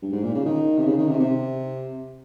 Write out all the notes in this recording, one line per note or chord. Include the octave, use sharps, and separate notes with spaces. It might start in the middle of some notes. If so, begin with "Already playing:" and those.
G2
G#2
A#2
C#3
D#3
C3
C#3
D#3
C3
C3